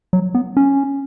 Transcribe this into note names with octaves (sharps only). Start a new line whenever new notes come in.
F#3
B3
C#4